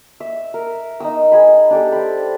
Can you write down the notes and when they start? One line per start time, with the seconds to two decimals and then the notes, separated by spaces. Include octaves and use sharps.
0.20 E5
0.54 A#4
1.00 D#4 D#6 E6
1.32 G#4 G#5 B5
1.70 D4 G4 A4
1.92 C5 B5